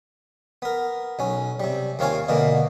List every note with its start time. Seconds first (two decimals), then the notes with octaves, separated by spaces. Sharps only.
0.62 B3 A#4
1.19 B1 C#4
1.60 C3 G3
1.99 D#2 C4 F4 C#5 F5 G#5
2.28 B2 D3 E3 A#3